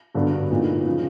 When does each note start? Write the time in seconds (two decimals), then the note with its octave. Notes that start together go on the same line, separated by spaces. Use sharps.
0.15 G2 D3 F#3 B3 D4
0.51 A#2 F#3 B3 D#4
0.86 C#3 F3